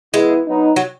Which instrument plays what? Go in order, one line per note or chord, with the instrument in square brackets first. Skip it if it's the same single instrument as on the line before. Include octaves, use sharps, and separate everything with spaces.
[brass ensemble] E3 B3 E4 [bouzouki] G#3
[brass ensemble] F#3 B3 D#4
[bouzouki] F#3